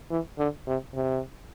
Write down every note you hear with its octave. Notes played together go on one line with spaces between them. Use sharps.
E3
D3
C3
C3